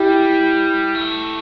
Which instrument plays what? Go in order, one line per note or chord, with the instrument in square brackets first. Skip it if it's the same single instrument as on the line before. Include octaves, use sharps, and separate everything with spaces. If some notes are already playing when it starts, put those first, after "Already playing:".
Already playing: [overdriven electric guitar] G3 [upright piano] E4 G4
[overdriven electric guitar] A3